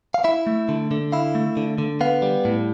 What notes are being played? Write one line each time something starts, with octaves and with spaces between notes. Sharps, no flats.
F5
E4 E5
A3
D3
D3
E4 F5
A3
D3
D3
B3 F5
G3
A2